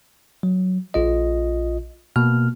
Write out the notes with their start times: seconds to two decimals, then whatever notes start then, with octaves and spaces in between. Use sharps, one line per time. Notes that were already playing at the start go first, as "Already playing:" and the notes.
0.43 F#3
0.94 A#1 F4 D#5
2.16 B2 A#3 F6